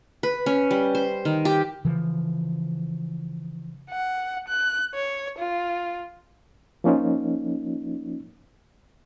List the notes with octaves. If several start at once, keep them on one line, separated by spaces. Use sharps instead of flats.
B4
C#4
G3
C5
D#3
G4
C#3 E3 F3
F#5
F#6
C#5
F4
F3 A#3 C#4 D#4 F4